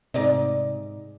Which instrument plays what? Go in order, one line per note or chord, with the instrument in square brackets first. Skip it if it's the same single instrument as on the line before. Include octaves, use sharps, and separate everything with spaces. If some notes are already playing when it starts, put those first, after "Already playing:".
[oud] G#2 D5 D#5 [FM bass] C3